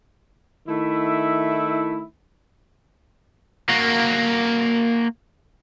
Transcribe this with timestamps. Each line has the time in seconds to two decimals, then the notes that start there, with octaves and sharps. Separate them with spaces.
0.68 D#3 A3 E4
3.70 A#3 F#4